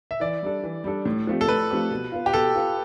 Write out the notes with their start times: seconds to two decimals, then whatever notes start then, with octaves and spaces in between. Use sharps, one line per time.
0.11 E5
0.20 E3 D5
0.43 G3 D4 A4
0.63 E3
0.84 G3 D4 A4
1.05 A2
1.27 F3 A3 C4 G4
1.41 A4
1.48 A2 B4
1.70 F3 A3 C4 G4
1.91 B2
2.12 B3 F4
2.26 G4
2.33 B2 A4
2.55 B3 F4